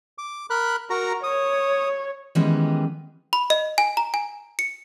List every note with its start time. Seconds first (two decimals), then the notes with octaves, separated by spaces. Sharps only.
0.18 D6
0.50 A#4 B5 F#6
0.90 F#4 A#4 A#5
1.23 C#5 D#6
2.35 D#3 E3 G3 G#3 B3 C#4
3.33 B5
3.50 D#5
3.78 G#5
3.97 A#5
4.14 G#5
4.59 C#7